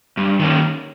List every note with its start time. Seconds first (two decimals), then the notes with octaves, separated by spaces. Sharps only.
0.17 G2
0.39 D#3 F#3 A#3 C#4